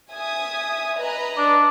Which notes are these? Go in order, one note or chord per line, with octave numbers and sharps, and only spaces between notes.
E5 G#5 D#6
B4 D#5 A#5
D4